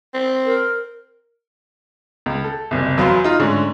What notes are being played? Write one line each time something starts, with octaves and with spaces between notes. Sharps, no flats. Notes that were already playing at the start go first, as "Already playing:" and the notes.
C4
A#4
C#2
A4
F#1 C2
E2 F#3 B3 F5 C6
D#4 F4
G#2 D3 A3 C#4